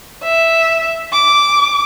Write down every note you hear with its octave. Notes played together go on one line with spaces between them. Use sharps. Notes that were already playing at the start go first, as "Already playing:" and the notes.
E5
D6